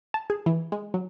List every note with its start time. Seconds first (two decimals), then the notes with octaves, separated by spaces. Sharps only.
0.14 A5
0.30 G#4
0.46 E3
0.72 G#3
0.94 F#3